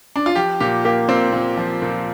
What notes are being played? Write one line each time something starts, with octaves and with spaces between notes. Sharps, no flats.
D4
F4
F3 G4
A#2 G4
A#3 G4
A#2 C4
A#2
F3
A#2